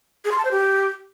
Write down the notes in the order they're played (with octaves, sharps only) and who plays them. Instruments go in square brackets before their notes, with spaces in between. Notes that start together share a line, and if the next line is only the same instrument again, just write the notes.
[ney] G#4
C6
A5
C5
G4